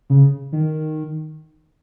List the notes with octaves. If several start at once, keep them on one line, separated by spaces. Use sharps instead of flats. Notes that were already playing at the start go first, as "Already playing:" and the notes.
C#3
D#3